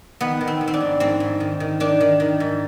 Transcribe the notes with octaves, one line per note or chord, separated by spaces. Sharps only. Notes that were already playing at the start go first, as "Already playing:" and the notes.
D#3 B3
D#3
C4
D#3
C4
D4
G#2
G#2 C4
G#2
D#3
D#3
D#3 D4
D#3
D#3
G#2